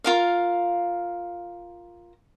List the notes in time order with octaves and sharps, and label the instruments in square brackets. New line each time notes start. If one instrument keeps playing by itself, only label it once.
[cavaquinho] F4 A#4 F5